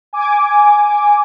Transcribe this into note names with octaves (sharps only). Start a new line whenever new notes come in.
G#5 D6